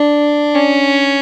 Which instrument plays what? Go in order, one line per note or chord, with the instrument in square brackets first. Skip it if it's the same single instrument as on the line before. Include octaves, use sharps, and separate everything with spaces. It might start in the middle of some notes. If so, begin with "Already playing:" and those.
Already playing: [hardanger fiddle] D4
C#4